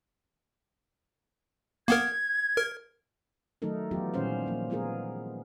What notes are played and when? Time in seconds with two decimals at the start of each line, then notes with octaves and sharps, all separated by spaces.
1.88 A#3 B3 A#4 G#6
2.57 A#4
3.62 D#3 F#3 A3 D#4 A4 A#4
3.91 E3 F#3 B3 F4 G4
4.14 A#2 D#3 G3 C#4 C5 F5
4.46 F3 A#3
4.70 G#3 B3 F4 G#4 A#4